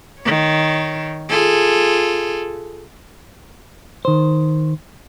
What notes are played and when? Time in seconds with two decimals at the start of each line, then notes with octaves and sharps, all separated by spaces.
0.21 D#3 C#5
1.29 F4 G#4 A4
4.05 D#3 C5